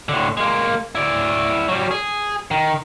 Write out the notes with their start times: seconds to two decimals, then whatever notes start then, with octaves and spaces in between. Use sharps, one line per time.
0.09 A2 D3
0.37 G#3 A#3
0.95 E4 D5
1.68 F#3 G3
1.91 G#4
2.51 D#3